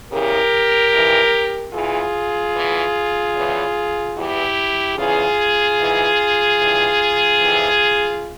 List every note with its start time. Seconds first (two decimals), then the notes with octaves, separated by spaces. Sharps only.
0.12 E2 C#3 E3 G4 A#4
0.93 F2 E3
1.74 E2 E3 F4 G#4
2.54 E2 E3
3.35 E2 C#3 E3
4.16 E2 E3 E4 G4
4.97 E2 C#3 E3 F4 G#4
5.78 G#2 E3
6.59 G2 E3
7.41 F2 C3 E3